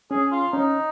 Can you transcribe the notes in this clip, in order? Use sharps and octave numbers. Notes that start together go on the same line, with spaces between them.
C#4 G#4
F4
C#4 D#4